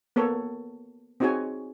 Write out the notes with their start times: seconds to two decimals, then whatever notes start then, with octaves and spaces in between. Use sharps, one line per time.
0.16 A#3 B3 A4 C#5
1.20 C4 D#4 F#4 G#4 C#5 G#5